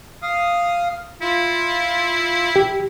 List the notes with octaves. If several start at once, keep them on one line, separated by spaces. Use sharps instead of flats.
F5 D#6
E4 F4
G4